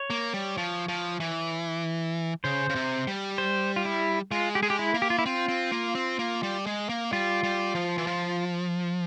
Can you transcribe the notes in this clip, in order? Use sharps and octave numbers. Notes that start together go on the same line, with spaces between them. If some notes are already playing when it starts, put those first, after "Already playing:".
Already playing: C#5
A#3
G3
F3
F3
E3
C#3 C5
C#3
C3
G3
C5
F4
E4
G#3 F4
G4
G#3 G#4
G4
E4
A#3
G4
F4
E4
C4 F4
C4
A#3
C4
A#3
G3
G#3
A#3
G3 F4
G3
F3
E3
F3